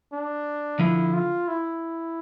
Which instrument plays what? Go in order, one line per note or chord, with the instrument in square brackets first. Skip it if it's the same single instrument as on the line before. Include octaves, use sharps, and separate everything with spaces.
[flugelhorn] D4
[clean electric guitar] D3 F3 [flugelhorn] E4
[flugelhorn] F4
E4